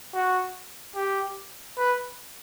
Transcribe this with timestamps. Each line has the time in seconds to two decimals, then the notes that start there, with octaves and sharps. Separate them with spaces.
0.14 F#4
0.95 G4
1.78 B4